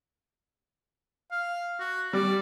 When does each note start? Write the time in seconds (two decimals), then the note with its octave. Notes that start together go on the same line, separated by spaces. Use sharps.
1.31 F5
1.79 F#4
2.13 G3 D5